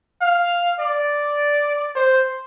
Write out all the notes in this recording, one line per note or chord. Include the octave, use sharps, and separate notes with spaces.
F5
D5
C5